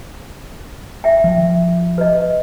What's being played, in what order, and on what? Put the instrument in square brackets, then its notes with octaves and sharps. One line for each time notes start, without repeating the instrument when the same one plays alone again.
[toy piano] E5 G5
[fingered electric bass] F3
[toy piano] B4 D#5